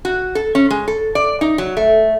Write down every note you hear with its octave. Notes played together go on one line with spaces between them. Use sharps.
F#4
A4
C#4
G#3
A4
D5
D#4
F#3
A3